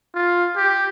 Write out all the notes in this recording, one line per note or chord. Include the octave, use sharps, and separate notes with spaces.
F4
G4